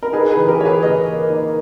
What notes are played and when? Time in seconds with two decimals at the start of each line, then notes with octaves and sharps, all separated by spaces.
0.02 A#4
0.13 D#4 G#4 B4
0.30 G#4 B4
0.37 E3
0.48 G4 A#4
0.60 E3 C#5
0.65 G#4 B4
0.83 A#3 B4 D#5
1.06 A#3
1.29 D#4